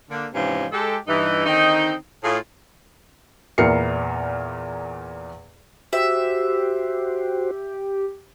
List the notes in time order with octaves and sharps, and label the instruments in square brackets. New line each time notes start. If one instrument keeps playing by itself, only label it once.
[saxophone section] D3 A#3 D4
G#2 C3 E3 F3 G#3 C#4
G#3 G4 A4
G2 E3 D#4
D3 D#3 C4 D#4
A2 F4 G#4
[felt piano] E2 A#2 E4 A#4 C7 C#7
[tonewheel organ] F#4 C5 [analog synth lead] G4 [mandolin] E5